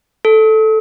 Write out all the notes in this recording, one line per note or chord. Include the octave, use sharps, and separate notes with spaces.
A4